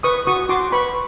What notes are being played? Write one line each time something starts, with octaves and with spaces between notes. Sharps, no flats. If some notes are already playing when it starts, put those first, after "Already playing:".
B4 C#6 D#6
F#4 C#6 D#6
F#4 C6 D6
B4 B5 C#6